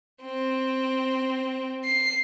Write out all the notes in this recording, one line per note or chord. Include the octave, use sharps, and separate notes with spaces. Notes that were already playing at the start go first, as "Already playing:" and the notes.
C4
C7